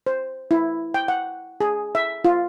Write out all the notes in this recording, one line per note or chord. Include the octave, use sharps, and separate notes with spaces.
C5
E4
G5
F#5
G#4
E5
F4